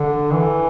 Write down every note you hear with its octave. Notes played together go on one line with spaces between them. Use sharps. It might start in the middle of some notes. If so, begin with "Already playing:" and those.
Already playing: D3
E3